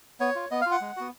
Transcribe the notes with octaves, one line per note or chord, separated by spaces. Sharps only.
B3 C#5
F4
B3 D#5
F5
F4
F#5
G#3
B3 F#4